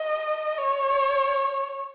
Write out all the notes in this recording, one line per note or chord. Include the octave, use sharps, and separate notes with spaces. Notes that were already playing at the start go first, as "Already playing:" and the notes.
Already playing: D#5
C#5